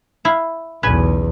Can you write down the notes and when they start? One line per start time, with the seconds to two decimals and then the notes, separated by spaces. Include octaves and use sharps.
0.25 E4 F5
0.83 B1 E2 C#3 B4 G#5